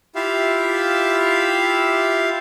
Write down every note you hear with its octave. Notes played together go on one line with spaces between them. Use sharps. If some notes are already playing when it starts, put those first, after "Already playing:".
E4 F4 G4 E5 F5